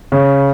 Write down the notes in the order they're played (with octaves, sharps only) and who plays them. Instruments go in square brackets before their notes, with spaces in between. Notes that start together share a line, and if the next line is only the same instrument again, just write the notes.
[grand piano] C#3